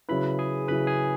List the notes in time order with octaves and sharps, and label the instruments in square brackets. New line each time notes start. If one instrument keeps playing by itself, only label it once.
[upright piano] C#3 F#3 E4 [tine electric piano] B4 B5
[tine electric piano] G#4 G#5
[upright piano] C#3 F#3 E4 [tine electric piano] B4 B5
[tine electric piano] G#4 G#5